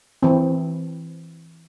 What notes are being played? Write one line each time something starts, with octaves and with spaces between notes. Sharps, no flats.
E3 C4